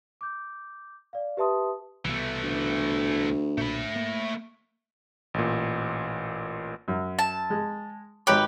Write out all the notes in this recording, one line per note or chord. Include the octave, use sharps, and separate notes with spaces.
D6 G6
D5 F5
G4 B4 E5 A5 C6 D#6
C2 B2 E3 A3
D2
B1 A#2 A3 B5
A#3
A1 A#2
F#2
A5
G#3
G#1 G4 B4 C#5